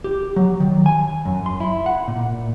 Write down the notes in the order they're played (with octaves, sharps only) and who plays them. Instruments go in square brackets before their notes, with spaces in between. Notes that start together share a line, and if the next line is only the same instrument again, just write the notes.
[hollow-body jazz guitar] G4
F#3
D#3
G#5
F#2
C6
E4
F#5
A#2